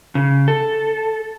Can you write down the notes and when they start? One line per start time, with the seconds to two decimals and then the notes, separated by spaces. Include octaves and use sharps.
0.15 C#3
0.48 A4